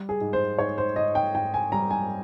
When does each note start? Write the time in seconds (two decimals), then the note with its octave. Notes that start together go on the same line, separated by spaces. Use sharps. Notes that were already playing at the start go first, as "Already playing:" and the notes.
Already playing: G3
0.09 G#4
0.21 G#2
0.33 C5
0.58 G#2 C#5
0.78 C5
0.96 G#2 D#5
1.15 G5
1.34 G#2 G5
1.54 G#5
1.72 G3 A#5
1.91 G#5